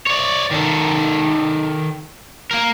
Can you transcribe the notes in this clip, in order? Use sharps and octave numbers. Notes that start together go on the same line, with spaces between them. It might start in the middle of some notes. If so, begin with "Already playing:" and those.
C#5 D5
D#3 A4
A#3 A#4